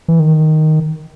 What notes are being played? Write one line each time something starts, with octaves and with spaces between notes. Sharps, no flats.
E3
D#3